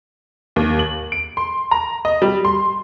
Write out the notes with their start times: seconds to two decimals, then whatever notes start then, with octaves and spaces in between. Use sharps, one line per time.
0.56 D#2
0.79 F#7
1.12 D7
1.37 C6
1.71 A#5
2.05 D#5
2.22 G3
2.45 C6